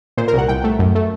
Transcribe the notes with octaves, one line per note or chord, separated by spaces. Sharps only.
A#2 C5
A#4
C2 F#5
C2 G5
A3
F#2
A3